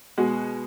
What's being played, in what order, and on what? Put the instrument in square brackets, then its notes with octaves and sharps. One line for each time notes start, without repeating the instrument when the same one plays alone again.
[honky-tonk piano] B2 G#3 F#4